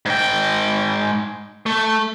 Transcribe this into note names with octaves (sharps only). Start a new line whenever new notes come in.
G#2 G5
A3